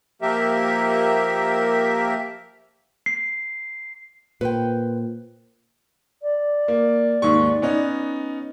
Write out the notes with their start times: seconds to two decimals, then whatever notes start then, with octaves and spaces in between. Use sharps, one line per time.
0.22 F3 A#3 G4 A#4 E5
3.06 C7
4.41 A#2 B4 C5 G5
6.22 D5
6.68 A#3
7.22 D#2 G#2 C#6
7.62 B3 C#4 D#4